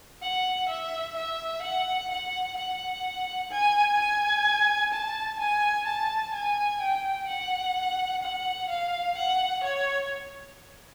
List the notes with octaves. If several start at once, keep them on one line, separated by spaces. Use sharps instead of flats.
F#5
E5
E5
F#5
F#5
F#5
G#5
G#5
A5
G#5
A5
G#5
G5
F#5
F#5
F5
F#5
C#5